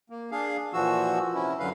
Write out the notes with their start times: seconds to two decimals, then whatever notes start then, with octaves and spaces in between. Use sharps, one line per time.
0.10 A#3
0.31 D4 G#4 F5
0.73 A#2 E3 F3 F#4 E6
1.35 C3 C#4 E4
1.59 F#2 D3 F#3 B4 F5